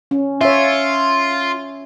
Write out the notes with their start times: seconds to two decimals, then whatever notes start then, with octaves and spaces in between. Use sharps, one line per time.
0.11 C#4
0.41 F4 C#5 E5